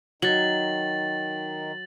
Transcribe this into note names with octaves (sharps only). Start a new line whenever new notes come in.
D#3 F#3 A6 F#7